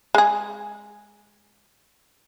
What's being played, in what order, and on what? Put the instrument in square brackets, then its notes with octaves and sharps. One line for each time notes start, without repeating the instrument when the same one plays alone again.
[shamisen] G#3 G#4